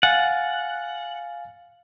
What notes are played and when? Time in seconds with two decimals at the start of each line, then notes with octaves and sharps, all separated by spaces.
0.03 F5 F#5 G#5 A6